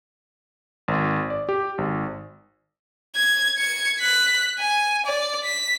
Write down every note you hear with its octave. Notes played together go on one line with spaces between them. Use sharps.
G#1
D5
G4
G#1
G#6
G#6 C#7
F#6 B6
G#5
D5
B6